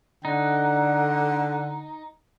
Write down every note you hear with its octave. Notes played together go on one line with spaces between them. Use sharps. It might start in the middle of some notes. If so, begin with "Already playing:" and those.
D3 D#4 F#5